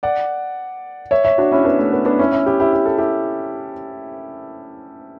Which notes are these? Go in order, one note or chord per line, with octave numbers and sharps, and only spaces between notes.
D5 F#5
C#5 E5
C#5 E5
D4 F#4
C#4 E4
B3 D4
A3
B3
B3 D4
C#4 E4
C#4 E4
E4 G4
E4 G4
G4
A4
E4 G4